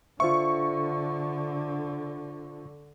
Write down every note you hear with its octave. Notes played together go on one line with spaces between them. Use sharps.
D3 F4 C5 E5 C#6